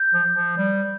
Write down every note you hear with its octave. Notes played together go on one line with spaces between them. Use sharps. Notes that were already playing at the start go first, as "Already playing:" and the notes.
Already playing: G6
F3
F3
G3